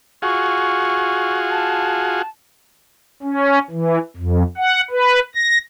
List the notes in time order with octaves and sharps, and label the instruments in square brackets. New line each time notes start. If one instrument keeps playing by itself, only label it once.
[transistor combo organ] F4 F#4 G#4 [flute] C#6
[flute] A5
[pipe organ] C#4
E3
F2
F#5
B4
A#6